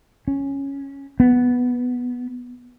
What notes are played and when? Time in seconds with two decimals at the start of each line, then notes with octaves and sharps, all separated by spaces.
0.28 C#4
1.20 B3